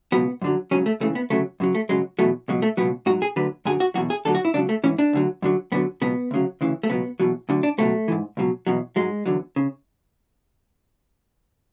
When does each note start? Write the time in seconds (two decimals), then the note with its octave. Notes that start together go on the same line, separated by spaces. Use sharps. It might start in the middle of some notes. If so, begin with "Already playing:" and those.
0.12 C#2 B2 F#3 B3
0.42 F#2 D3 F#3
0.71 C#2 C#3 F#3 C#4
0.86 A3
1.00 C#2 C#3 E3 A3
1.15 B3
1.30 D2 C#3 F#3 A3
1.60 F#2 C#3 F#3
1.75 A3
1.89 F#2 C#3 F#3 G#3
2.19 E2 B2 F#3 A3
2.48 C#2 B2 F#3
2.62 A3
2.77 C#2 B2 F#3 B3
3.06 G#2 F#4
3.10 F#3
3.22 G#4
3.36 D2 D3 F#3 B4
3.65 F#2 D3 F#3 G#4
3.80 F#4
3.94 E2 B2 F#3 F#4
4.10 G#4
4.25 D2 D3 F#3 A4
4.35 F#4
4.45 E4
4.54 C#2 C#3 F#3 D4
4.69 A3
4.84 G#2 E3 C#4
4.98 D4
5.13 D2 D3 F#3
5.42 F#2 D3 F#3
5.72 F#2 D3 F#3 B3
6.02 C#2 B2 F#3 B3
6.31 D2 C#3 F#3
6.61 D2 C#3 E3
6.83 A3
6.90 C#2 B2 F#3 B3
7.20 E2 B2 F#3
7.49 D2 D3 F#3
7.63 D4
7.78 C#2 B2 F#3 A3
8.08 G#2 E3
8.37 C#2 B2 F#3
8.67 E2 B2 F#3
8.96 G#2 F#3 G#3
9.26 E2 D3 F#3
9.56 C#3